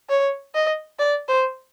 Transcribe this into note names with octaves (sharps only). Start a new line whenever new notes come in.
C#5
D#5
D5
C5